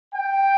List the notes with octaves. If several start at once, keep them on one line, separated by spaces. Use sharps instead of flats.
G5